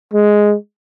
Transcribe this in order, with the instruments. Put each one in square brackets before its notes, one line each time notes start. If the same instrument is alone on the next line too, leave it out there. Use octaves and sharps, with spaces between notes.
[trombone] G#3